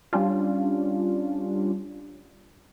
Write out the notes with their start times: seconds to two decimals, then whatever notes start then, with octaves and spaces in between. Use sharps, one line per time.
0.13 G3 C#4 D4 F4